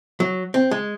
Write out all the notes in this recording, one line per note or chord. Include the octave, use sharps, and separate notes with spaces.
F#3
C4
G#3